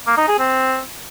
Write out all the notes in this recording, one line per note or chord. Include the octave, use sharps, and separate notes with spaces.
A#3
D#4
G#4
C4